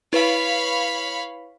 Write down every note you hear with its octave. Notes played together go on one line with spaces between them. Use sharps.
E4 B4 C#5 F5 B5